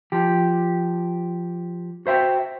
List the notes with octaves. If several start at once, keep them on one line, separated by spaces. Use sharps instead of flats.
F3 G4
F#4 C5 E5 G5